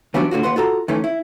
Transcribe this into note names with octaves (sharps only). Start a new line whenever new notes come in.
E3 F#3 G3 B3 C#4 D4
A2 D3 F4 F#4
D#2 B4 F#5 C6
F4 F#4 A4 A#5
D#3 E3 A3 C#4
E4